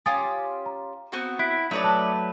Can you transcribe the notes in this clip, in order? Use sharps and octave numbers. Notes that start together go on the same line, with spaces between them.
C#4 F4 G4 G#5 D#6 A6
A#5
B3 C4 F#4
E4 F#6 B6 D7
F#3 A3 D#4 B4 C#5 D5
A5 F#6